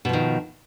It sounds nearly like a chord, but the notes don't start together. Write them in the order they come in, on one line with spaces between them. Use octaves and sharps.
B2 F3 D#3